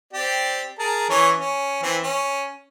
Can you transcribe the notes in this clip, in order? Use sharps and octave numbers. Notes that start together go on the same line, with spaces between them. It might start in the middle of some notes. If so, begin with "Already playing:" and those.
C4 G4 D5
G#4 A#4 A5
E3 C#4 C#5
C#4
E3 C4
C#4